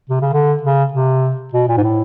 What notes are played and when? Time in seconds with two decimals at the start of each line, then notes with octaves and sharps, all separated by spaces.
0.10 C3
0.21 C#3
0.33 D3
0.63 C#3
0.93 C3
1.53 B2
1.68 A#2
1.77 G#2
1.83 A2